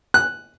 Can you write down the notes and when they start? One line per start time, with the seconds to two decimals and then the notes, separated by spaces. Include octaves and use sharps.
0.14 F#6